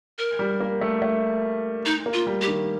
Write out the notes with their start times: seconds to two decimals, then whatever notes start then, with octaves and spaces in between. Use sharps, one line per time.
0.18 A#4
0.39 G3
0.60 A#3
0.81 A3
1.02 A3
1.86 D#4
2.06 A#3
2.14 F4
2.27 G3
2.41 G4
2.48 D#3